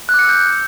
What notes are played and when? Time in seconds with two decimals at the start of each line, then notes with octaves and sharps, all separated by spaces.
0.09 F#6
0.14 D6
0.19 C#7
0.24 E6
0.29 G6